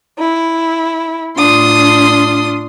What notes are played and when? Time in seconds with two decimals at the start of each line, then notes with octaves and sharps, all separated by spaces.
0.19 E4
1.37 A2 D4 F4 C6 D#6